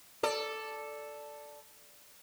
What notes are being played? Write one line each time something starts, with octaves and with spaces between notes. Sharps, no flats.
A4 D5